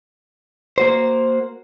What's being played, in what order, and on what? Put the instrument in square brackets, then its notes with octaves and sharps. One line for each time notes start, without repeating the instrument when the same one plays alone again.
[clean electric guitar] A#3 F#4 C5